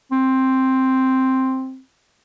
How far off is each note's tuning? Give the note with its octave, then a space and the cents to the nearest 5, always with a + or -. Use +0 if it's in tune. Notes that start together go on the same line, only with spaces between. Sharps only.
C4 +5